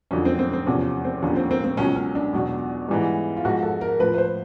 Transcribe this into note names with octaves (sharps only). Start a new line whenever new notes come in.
F2 D3 F#3 C#4
C4
C4
C4
E2 C3 F3 C#4
C4
D#2 D3 F3 C#4
C4
C4
C4
C#2 B2 F#3 C#4
C#4
D4
E2 B2 F#3
G#2 E3 G3
F4
G#2 F3 F#4
A4
A#4
A2 F3 B4
B4
C5